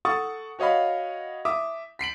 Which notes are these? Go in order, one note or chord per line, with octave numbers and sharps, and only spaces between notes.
A4 F#5 A5 C#6 D#6 A6
F#4 C#5 D#5 F5 B5
E5 D6 D#6
B6 C7 D7 F#7